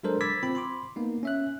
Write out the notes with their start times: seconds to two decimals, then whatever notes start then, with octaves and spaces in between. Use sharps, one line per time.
0.03 F#3 G#3 D4 A4 A#4 C5
0.21 B5 D6 E6 G#6 A6 B6
0.43 C4 F4 B5
0.55 B5 C6 D6
0.96 A#3 B3 D#4
1.23 C#4 E5 F#6